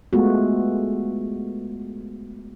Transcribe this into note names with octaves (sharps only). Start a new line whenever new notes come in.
G#3 A3 B3 F4 F#4